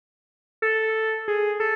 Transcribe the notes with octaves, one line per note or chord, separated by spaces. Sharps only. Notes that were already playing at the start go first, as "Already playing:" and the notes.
A4
G#4
A4